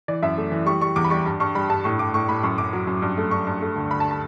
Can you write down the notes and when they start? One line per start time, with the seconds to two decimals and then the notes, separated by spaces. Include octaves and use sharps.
0.08 E3 D5
0.23 F#2 E5
0.37 A3
0.51 E3
0.66 G3 C#6
0.81 G3 C#6
0.96 E2 D6
1.04 B5
1.10 G3 C#6
1.26 G2
1.40 G2 C#6
1.55 G3 B5
1.70 G2 A5
1.84 A2 C#6
1.99 A2 D6
2.14 A2 C#6
2.29 A2 B5
2.43 F#2 C#6
2.58 F#2 D6
2.73 F#3
2.87 F#2
3.02 G2
3.17 A3
3.31 G2 C#6
3.47 G2
3.62 A3
3.76 D2
3.91 D2 B5
4.00 A5
4.11 A5